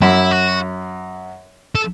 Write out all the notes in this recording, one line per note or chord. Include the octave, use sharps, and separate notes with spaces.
F#2 E4
F#4
A4